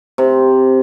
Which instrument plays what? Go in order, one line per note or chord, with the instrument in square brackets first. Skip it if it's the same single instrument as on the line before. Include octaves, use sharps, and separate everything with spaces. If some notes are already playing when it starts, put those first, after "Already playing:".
[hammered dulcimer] C3